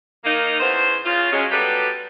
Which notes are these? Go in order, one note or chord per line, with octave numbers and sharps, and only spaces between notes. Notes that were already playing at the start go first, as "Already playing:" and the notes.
D#3 A#3 D#4
E2 C#3 B3 C5
C#3 F4
F#3 G#3 C#4
F#3 G3 B3 G4 A4 B4